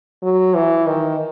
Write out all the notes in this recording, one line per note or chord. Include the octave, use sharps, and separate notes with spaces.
F#3
E3
D#3